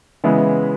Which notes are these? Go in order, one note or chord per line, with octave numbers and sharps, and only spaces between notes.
C#3 E3 G#3 B3 E4